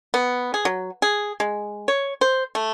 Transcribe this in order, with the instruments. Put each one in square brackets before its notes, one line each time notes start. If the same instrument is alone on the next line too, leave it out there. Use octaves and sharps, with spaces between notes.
[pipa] B3
G#4
F#3
G#4
G#3
C#5
C5
A3